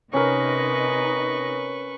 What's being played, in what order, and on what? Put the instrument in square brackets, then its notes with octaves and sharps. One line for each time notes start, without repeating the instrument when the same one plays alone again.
[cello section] C3 D#4 D#5 [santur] C#4 A#4 [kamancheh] B4 C#6